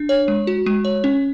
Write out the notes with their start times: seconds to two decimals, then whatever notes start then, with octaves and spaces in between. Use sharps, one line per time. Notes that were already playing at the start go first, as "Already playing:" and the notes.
Already playing: D4
0.09 C#5
0.28 G#3
0.47 F#4
0.66 G#3
0.85 C#5
1.04 C#4